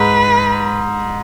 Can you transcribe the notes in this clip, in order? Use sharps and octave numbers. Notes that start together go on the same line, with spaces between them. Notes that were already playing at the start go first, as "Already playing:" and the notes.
Already playing: G#2 B4